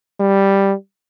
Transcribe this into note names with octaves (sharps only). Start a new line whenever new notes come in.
G3